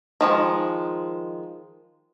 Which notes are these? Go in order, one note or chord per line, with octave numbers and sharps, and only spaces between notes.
D#3 F3 G#3